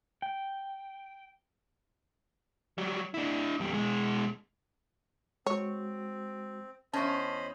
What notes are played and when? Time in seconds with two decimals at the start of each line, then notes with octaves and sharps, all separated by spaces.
0.22 G5
2.78 F#3 G3
3.14 D4 E4
3.60 E2 G3
3.74 B2 G#3
5.46 G#3 C4 F#4 C#5
6.93 E2 C#4 C5 D#5 A5 B5 C#6